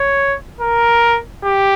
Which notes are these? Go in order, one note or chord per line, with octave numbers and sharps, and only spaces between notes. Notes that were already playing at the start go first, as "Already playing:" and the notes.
Already playing: C#5
A#4
G4